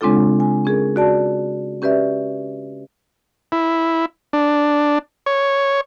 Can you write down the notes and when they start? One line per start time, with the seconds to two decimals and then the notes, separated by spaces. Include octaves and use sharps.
0.01 C#3 G#3 C4 D4 F4 A4
0.40 G#5
0.65 C#4 G#4 A#4
0.96 F#4 D5 A5
1.82 C#4 G4 B4 D5 E5
3.52 E4
4.33 D4
5.26 C#5